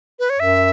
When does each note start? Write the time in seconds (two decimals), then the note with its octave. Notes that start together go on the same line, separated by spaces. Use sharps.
0.19 B4
0.30 C#5
0.40 F#2 E5